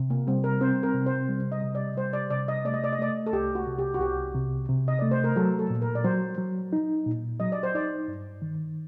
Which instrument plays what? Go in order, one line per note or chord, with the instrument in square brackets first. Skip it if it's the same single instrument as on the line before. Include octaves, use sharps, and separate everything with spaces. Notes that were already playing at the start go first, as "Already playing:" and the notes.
Already playing: [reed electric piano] C3
[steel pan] A#3
[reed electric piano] G3 [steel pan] C4
[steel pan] A#4
[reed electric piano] C4 [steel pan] C5
[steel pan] A#4
[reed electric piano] C3
[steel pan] C5
[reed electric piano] G3
[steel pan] D#5
[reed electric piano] C3
[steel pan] D5
[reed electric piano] G3 [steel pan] C5
[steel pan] D5
[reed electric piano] C3 [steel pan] D5
[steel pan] D#5
[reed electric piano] A3 [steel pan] D5
[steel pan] D#5
D5
D#5
[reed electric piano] A3 [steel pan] D5
[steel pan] A4
[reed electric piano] C2 [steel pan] G4
[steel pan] F#4
[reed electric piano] C3
[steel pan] G4
F#4
[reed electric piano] C2 [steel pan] G4
[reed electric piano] C3
C3
[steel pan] D#5
[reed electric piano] A3 [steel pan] D5
[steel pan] C5
A#4
[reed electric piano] F#3 [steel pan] A4
[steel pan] A4
[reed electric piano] A#2
[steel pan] A#4
D5
[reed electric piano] F#3 [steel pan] C5
[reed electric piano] F#3
D#4
A#2
[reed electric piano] F#3 [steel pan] D#5
[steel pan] D5
C5
[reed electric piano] D#4 [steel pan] D5
[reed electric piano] G2
D#3